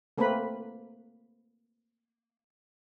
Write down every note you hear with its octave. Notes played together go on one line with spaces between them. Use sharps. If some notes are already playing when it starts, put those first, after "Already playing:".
A3 A#3 C4 A#4 B4 B5